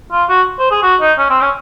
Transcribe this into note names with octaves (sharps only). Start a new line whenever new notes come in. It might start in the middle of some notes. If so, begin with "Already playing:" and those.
F4
F#4
C5
G#4
F#4
D#4
C#4
C4
C#4